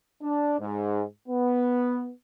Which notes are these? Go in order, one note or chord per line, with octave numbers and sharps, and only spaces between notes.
D4
G#2
B3